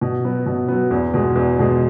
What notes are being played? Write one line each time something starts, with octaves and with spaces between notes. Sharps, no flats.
B2
F#3 B3
B2
F#3 B3
E2
B2 G#3
E2
B2 G#3